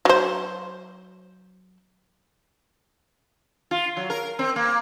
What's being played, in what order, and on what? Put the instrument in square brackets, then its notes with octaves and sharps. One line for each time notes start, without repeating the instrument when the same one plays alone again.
[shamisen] F#3 C5
[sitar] F4
F#3
A#4
C4
A#3